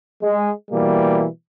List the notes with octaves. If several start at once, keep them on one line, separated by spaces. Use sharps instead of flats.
G#3
B2 E3 G3 A#3